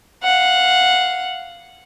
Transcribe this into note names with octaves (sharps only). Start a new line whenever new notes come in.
F5 F#5